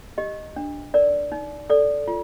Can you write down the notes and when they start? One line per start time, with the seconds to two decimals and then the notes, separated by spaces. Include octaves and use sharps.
0.18 G4 D#5
0.56 D4
0.94 A#4 D5
1.32 D#4
1.70 A4 D5
2.08 F4